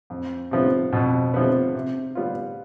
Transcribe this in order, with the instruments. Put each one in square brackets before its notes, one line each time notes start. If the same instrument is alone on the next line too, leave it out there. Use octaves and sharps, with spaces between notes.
[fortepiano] F2
C3 F3 B3
[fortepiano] F2 [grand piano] B2
[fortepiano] C3 F3 B3
C3
G3 B3 F4